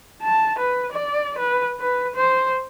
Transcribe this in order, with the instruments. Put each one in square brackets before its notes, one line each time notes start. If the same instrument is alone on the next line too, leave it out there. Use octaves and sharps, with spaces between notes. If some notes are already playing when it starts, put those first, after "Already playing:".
[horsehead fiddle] A5
B4
D5
B4
B4
C5